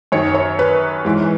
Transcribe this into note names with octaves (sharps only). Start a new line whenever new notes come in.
F#2 D#3 C#5
C#5
B4
G#2 E3